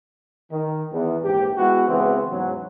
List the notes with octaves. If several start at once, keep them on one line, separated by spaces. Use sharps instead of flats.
D#3
E2
A#1 G#2 G4
G#3 B3 E4 F#4
C#3 E3 G#3 B3 C4
E2 G#2 C#3 F#3